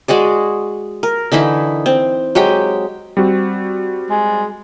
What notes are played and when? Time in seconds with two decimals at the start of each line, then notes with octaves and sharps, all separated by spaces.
0.08 G#3 F#4 G#4 D5
1.03 A#4
1.32 D3 E3 D#4 E4
1.86 C4
2.35 F#3 G#3 G4 G5
3.17 G3 C4 F#4
4.10 G#3